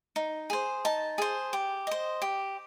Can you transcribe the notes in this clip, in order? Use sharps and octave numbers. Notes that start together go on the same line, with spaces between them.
D#4
G#4 C5
D#4 A5
G#4 C5
G4
C5 D#5
G4